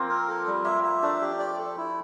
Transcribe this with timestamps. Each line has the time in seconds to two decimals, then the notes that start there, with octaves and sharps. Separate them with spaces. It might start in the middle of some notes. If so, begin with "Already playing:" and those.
Already playing: F3 A#3 C4 F4
0.09 A#4
0.28 A4
0.46 G3
0.65 A#3 E5
0.83 E5
1.02 A3 D4
1.21 G4
1.39 D5
1.59 A4
1.77 E4